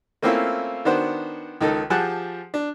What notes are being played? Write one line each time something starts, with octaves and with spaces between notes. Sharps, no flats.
A3 A#3 C4 C#4 E4 F4
D#3 B3 D4 F#4 C5
C#2 D#3 D#4 A4
F3 G4 G#4 F#5 A5 F#6
D4